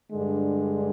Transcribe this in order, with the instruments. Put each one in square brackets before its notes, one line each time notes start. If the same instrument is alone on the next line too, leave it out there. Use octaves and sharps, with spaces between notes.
[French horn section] G2 D3 G#3